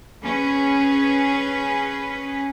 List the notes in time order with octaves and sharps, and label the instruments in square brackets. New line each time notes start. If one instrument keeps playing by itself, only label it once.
[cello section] C#4 G#4 B4